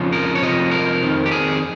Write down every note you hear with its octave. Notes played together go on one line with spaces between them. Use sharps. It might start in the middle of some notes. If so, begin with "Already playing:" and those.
Already playing: F2 C#3 F3
A#4
C#5
F2 C3 F3 D#5
A#4
F2 D#3
G4
G#4